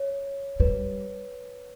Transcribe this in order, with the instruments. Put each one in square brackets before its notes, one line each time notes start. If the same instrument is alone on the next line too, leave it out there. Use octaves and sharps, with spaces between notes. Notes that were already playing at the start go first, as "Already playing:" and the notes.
Already playing: [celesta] C#5
[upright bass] G3 [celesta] B4